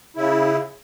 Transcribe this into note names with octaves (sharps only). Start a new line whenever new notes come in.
C#3 E4